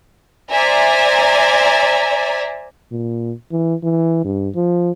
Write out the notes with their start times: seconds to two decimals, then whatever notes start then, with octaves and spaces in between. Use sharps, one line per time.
0.50 C5 D5 E5 G#5 A#5
2.92 A#2
3.52 E3
3.83 E3
4.25 G2
4.55 F3